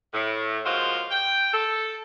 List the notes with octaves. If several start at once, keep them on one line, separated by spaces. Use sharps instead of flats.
A2
F3 G#3 A#3 F4 F#4 C5
G5
A4